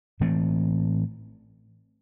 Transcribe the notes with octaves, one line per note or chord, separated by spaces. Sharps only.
A2 E3 A3 C4